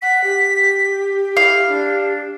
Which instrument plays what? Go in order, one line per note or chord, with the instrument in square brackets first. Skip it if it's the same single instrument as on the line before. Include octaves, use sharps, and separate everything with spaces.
[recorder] F#5 [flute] B6
[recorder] G4
[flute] E4 [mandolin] F5
[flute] D4